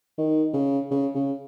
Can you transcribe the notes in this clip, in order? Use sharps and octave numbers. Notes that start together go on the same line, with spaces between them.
D#3
C#3
C#3
C#3